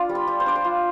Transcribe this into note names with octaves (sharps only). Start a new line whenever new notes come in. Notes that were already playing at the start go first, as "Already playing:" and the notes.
Already playing: D4 F4 D5
G3
B5
G3
C5
D4 D5
C5
F4